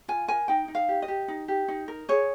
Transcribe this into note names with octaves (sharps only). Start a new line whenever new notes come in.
F4 G#5
A#4 G#5
D#4 G5
D#4
F5
G4
D#5
G4
D#4
G4
D#4
A#4
G#4 C#5